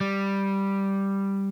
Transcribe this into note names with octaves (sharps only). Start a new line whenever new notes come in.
G3